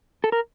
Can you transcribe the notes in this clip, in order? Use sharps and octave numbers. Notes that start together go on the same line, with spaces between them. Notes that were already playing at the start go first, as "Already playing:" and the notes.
A4
A#4